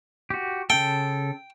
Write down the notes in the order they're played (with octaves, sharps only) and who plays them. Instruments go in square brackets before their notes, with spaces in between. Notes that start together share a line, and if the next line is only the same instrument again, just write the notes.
[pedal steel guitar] F#4 G4
[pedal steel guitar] C#3 A4 [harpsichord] G5